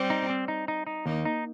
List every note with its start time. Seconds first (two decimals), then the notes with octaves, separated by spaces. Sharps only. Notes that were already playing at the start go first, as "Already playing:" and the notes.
Already playing: G3 C4
0.10 D#4
0.30 C4
0.48 D#4
0.68 D#4
0.87 D#4
1.06 D#2 A#3 D#4
1.25 D#4